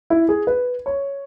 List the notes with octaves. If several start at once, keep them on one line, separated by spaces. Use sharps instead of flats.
E4
G#4
B4
C#5